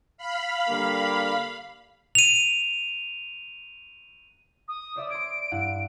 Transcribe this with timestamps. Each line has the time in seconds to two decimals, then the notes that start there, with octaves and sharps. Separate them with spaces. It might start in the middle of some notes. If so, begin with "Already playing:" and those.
0.18 F5 B5
0.69 D3 G3 A#3
2.15 D#7 F7
4.68 D#6
4.96 C5 D5 E5
5.10 C6 G#6 D7
5.52 G2 E4 F#5